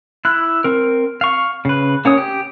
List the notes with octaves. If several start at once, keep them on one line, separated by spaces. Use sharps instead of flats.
E4 F#6
C4 A#4
F5 C#6
C#3 B4
A#3 C#4 C#5 D#6
G4